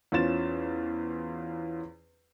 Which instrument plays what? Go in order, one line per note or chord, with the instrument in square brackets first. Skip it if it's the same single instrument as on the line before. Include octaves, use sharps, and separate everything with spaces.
[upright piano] E2 C#4 F4 C5 A6 E7